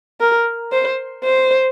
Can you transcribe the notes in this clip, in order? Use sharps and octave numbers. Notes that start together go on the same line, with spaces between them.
A#4
C5
C5